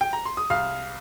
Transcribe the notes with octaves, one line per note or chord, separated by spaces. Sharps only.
G5
A#5
C6
D#6
C2 F5 F6